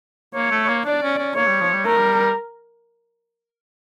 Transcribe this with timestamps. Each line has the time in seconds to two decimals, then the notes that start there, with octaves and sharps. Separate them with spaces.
0.35 A#3 C#5
0.51 A3
0.68 A#3
0.85 D4 D5
1.02 C#4
1.18 C#4
1.35 A#3 C#5
1.47 G3
1.61 F3
1.73 G3
1.85 A3 A#4
1.97 G3